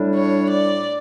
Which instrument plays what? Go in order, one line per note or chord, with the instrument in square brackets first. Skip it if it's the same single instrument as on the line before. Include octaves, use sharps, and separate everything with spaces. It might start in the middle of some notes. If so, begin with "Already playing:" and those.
Already playing: [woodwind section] A2 G3 D4
[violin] C#5
D5